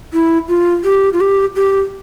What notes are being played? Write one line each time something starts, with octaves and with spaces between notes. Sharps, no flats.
E4
F4
G4
F4
G4
G4